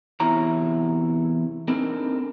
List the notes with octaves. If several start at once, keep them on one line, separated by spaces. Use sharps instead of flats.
E2 C3 E4 C#5 A#5
C4 D4 D#4 A4 A#4